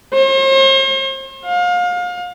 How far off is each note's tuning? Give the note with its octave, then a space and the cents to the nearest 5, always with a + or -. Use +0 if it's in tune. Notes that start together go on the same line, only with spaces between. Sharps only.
C5 +45
F5 +35